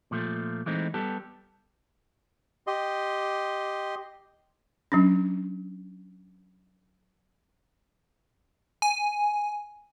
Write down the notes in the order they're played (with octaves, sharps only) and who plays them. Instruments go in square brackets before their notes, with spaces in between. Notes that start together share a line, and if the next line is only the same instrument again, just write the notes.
[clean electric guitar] A#2 F3 A3
E3 G#3 A3 C4 D#4
G3 B3 G4 A4
[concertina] G4 D#5 C6
[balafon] F#3 C#4 D4
[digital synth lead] G#5